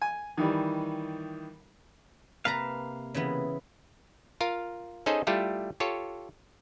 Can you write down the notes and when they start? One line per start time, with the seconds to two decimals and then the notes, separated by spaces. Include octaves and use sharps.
0.02 G#5
0.37 D#3 E3 G3
2.45 C3 A#3 B4 F5 A5 A#5
3.14 C#3 E3 B3
4.41 F4 A#4 F5
5.06 C#4 D#4 G#4 A4 C5 D#5
5.27 G3 A3 E4 F4 G4 A4
5.80 F4 G4 A4 C#5